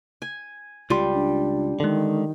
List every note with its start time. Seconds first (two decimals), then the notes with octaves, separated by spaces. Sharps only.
0.22 G#5
0.90 C#2 G3 F4 C6
1.13 D4
1.80 D3 D#3 G#3